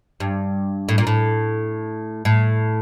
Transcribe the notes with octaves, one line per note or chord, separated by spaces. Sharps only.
G2
A2
A#2
A2
A2